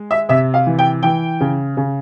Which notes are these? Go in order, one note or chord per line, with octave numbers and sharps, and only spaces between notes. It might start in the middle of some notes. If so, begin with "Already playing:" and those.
Already playing: G#3
E5
C3 E5
F5
E3
G5
E3 G5
C#3
C#3